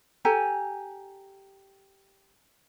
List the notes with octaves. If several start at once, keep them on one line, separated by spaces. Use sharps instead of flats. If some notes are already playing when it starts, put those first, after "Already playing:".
G4 A4 G#5 A#5